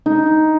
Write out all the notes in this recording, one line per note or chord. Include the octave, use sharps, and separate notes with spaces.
D#4